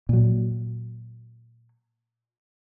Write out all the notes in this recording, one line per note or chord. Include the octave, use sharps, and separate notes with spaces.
A#2 F#3